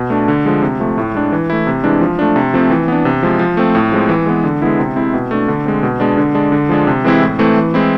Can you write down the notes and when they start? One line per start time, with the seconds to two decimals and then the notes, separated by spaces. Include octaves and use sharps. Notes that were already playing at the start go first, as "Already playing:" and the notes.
Already playing: B2
0.10 A3 D4
0.28 D3
0.46 F3 G#3
0.62 C3
0.80 F3 A3
0.98 A2
1.14 G#3 D4
1.32 E3
1.50 A3 E4
1.67 C3
1.84 E3 G#3 D4
2.01 F3
2.19 A3 D4
2.36 C3
2.54 F3 A3 C4
2.70 E3
2.88 B3 D4
3.05 C3
3.23 F3 G#3
3.39 F3
3.57 A3 C4
3.75 A2
3.92 F3 G#3 C4
4.09 E3
4.26 G#3 B3
4.44 D3
4.62 G#3 B3 E4
4.79 C3
4.96 G#3 C4 E4
5.14 B2
5.31 A3 D4
5.48 D3
5.66 G#3 C4
5.83 B2
6.00 G#3 B3 D4
6.18 D3
6.35 G#3 D4
6.52 D3
6.69 F3 G#3 D4
6.87 C3
7.04 E3 G#3 C4 E4
7.22 A2
7.39 E3 A3 C4
7.56 E3
7.74 G#3 C4 E4